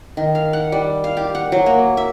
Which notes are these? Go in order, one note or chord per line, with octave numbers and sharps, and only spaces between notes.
D#3
F5
F#5
G3
F5
G4
F#5
F#3
A#3
E5